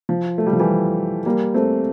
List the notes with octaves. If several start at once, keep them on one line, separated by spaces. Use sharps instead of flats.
F3
A3
G3
F3
E3 G3
G3 A#3
A3 C4